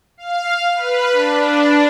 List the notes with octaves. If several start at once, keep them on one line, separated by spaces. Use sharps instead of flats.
F5
B4
D4